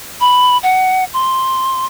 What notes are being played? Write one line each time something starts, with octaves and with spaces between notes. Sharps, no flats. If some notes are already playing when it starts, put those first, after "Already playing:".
B5
F#5
C6